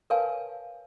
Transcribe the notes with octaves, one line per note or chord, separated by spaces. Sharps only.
A#4 B4 C#5 F5 G#5 A5